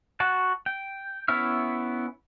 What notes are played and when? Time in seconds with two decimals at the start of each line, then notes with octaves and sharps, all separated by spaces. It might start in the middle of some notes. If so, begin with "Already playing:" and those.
0.20 F#4 F#5 A5
0.66 G5
1.28 B3 C#4 E4 E5 F6